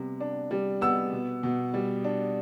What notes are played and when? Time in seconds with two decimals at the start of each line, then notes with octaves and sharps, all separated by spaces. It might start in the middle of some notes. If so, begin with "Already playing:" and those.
Already playing: C3 G3 B3
0.20 D4
0.51 G3
0.81 B3 E6
1.13 B2
1.43 B2
1.74 G3
2.04 D4